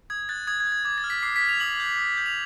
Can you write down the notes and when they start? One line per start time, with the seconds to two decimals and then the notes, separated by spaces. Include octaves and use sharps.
0.10 D#6 G#6
0.29 F#6 A6
0.47 D#6 G#6
0.60 G#6
0.67 F#6
0.72 G#6
0.85 D6 G#6
0.98 A6
1.04 F6
1.10 B6
1.23 D6 C7
1.36 B6
1.42 F6
1.49 F7
1.60 D#6 F#7
1.80 G6
1.98 D#6
2.17 G6
2.26 F7